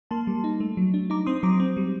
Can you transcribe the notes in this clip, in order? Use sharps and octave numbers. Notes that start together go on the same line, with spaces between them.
A#3 A5 C6
G3
D#4
A3
F#3
D4
D#4 A#5 D6
C4 C6 D#6
F#3 A#5 D6
C4
G3